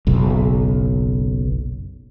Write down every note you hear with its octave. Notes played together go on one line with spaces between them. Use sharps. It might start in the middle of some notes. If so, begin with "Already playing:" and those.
F#1 B1